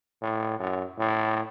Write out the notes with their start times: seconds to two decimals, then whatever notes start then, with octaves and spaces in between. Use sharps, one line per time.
0.22 A2
0.59 F#2
0.99 A2